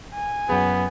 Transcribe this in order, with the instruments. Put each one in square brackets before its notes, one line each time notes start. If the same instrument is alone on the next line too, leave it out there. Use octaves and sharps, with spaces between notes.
[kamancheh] G#5
[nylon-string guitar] F#2 G#4 [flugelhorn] B3